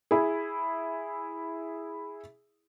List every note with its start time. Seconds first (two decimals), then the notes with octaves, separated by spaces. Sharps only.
0.11 E4 G#4